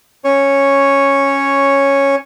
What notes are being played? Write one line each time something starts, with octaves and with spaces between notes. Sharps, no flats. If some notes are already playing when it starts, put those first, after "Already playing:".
C#4 C#5